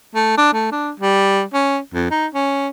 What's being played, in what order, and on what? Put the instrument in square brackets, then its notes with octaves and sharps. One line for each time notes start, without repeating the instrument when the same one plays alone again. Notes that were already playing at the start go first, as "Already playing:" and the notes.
[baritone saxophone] A3
D4
A3
D4
G3
C#4
F2
D#4
C#4